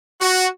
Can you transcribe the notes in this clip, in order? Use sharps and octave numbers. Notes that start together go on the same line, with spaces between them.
F#4